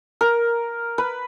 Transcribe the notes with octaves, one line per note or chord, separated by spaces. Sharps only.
A#4
B4